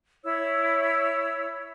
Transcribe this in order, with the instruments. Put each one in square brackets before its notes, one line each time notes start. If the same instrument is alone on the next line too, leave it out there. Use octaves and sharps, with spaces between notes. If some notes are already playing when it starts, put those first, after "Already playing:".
[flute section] E4 C#5 E6